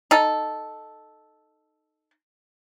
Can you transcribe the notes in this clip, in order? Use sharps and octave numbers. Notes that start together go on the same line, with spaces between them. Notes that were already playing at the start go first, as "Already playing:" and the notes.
D#4 A4